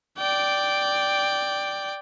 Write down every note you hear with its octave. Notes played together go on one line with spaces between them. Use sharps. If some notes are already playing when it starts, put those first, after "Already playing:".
D5 G5